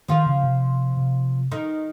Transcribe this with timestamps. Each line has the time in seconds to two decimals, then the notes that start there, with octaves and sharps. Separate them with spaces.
0.08 D#3 F3 F4
0.26 C#3
0.44 C3
0.98 C3
1.52 D#3 D#4